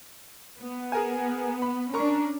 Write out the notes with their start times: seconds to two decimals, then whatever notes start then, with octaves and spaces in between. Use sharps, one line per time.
0.61 B3
0.92 G#4 A#4 G#5
1.62 B5
1.93 C#4 D4 A#4 A#5 C#6